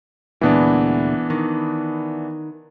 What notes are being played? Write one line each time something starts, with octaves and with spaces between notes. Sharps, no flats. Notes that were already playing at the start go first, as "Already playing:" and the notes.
D2 A#2 E3 G#3 B3 D4
D#3